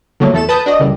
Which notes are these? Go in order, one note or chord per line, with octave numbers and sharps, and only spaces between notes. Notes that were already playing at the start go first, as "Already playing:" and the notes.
D3 F3 F#3 A3 A#3
E2 A3 A4 E7
B4 A5 D#6 G6
D4 F#4 D#5
C#2 F#2 E3 G3